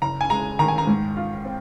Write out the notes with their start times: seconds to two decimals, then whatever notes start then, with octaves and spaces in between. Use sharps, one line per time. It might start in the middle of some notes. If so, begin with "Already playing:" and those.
0.02 F#1 A#5
0.21 G#5
0.30 G#3 A#5
0.59 D#3 A#5
0.68 G#5
0.78 A#5
0.87 G#2
1.17 F4
1.45 C4